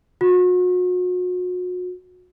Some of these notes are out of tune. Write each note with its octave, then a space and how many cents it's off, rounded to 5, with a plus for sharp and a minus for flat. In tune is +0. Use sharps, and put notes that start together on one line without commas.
F#4 -40